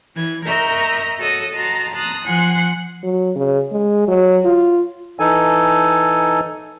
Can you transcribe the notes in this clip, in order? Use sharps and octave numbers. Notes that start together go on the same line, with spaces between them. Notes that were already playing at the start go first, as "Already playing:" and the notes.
E3 G#6
A#4 D#5 E5 A#5 C#6 G6
F#4 A4 C#5 D#5 D#6 E6
F#4 D#5 A5 A#5 C6
A5 A#5 C6 D#6 F#6
F3 F#5 G#5 C6 F#6
F#3
C#3
G#3
F#3
F4
E3 D#4 A4 G#5